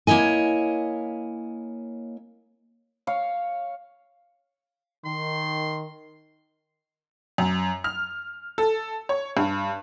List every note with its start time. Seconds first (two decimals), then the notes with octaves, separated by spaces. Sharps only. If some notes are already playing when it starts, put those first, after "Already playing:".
0.07 A#3 E4 C#5 D#5 G#5
3.07 C#5 F5
5.05 D#3 C6
7.38 F#2
7.84 F6
8.58 A4
9.09 C#5
9.37 G2